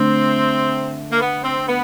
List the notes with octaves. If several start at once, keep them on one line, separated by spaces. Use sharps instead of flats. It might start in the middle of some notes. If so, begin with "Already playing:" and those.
Already playing: D3 A3 C4
A#3
B3
C4
B3